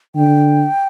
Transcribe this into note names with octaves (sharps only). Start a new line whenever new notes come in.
D3 G5